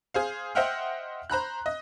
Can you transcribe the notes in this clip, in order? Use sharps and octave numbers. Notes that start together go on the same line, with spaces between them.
G#4 C5 F5
C5 D#5 E5 F#5 G5 F6
C5 A#5 B5 F#6
D#5